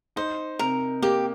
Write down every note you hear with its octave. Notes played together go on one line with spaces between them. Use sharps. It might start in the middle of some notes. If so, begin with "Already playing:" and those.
D#4 C5
C3 A#4
A#3 G4